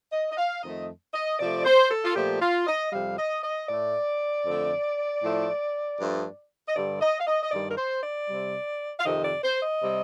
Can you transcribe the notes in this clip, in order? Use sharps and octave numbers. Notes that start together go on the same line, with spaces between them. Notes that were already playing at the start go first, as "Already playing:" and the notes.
D#5
D#5
F5
F2 D#3 A3 D#5
D#5
C3 F3 A3 D5
C5
A4
F4
A#2 F3 A3 G4
F4
D#5
F2 C3 G3 F5
D#5
D#5
A2 A3 D5
F2 D3 A3
A2 F3 A3
G2 F3 A3
D#5
G2 D3 G3 D5
D#5
F5
D#5
D#5
G2 D#3 G3 D5
A#4
C5
D5
C3 G3
F5
F2 C3 D#3 D#5
D5
C5
D#5
C3 G3